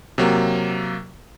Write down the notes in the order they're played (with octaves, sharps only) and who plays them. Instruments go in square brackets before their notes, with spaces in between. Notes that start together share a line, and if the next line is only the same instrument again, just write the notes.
[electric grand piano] C3 F#3 A#3